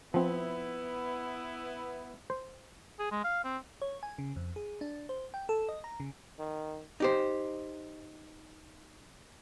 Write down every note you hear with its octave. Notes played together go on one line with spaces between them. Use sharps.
F3 B3 C4 E4
C5
G#4
G#3
F5
C4
C#5
G#5
C#3
F2
G#4
D4
C5
G5
A4
D#5
A#5
C#3
D#3
D#4 G4 C5